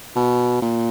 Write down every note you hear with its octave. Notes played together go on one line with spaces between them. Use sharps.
B2
A#2